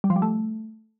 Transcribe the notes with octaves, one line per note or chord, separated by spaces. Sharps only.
G3
F3
G3
A3